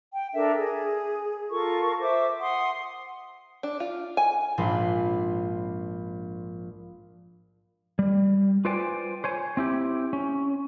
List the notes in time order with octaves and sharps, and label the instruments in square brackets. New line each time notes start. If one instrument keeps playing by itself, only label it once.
[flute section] G5
D4 A4 A#4 E5
G#4
F4 A4 A#4 C#6
C5 E5 D6
F#5 C6 D#6
[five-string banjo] D4
F4
G#5
[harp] A#1 G#2 D4 F5 B5 C6
[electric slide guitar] G3
F4 B4 C5 D5 G5 G#5
C5 C#5 G#5
C4 E4 G4
C#4